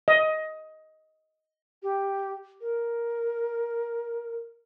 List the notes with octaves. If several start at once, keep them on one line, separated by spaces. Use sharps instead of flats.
D#5
G4
A#4